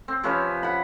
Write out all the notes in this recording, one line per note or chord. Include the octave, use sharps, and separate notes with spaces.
C4
C3 F3 C#4 B4
F#5 B5